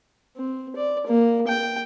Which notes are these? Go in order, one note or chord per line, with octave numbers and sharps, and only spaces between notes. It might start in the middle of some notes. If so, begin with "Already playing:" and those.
C4
D5
A#3
G5